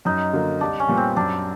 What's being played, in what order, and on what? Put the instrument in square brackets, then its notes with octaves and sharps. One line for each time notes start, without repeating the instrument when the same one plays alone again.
[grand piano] F#2 [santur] D#4
[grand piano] D3 F#3 A#3
[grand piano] C2 [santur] D4
[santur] C#4
[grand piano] A#2 G3 B3
[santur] C4
[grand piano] F#2 [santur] D4